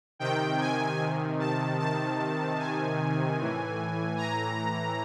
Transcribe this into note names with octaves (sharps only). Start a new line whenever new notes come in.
C3 D#3 G5
G#5
A5
A5
G#5
A2 E3
A#5